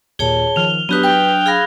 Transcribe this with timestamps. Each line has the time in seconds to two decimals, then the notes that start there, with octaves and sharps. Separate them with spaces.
0.19 D#2 A#2 G#4 C#5 A5 G7
0.56 D#3 F3 F6 F7
0.89 F#3 B3 D4 G4 B4 D#6 F#6 G7
1.03 B4 G5 G6
1.46 G#4 F5 B5 F6 G#6 A#6